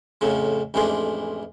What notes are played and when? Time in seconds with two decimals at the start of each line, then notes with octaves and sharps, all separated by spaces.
0.21 F2 A2 C#3 F3
0.74 A1 F2 E3 G#3 D4 C6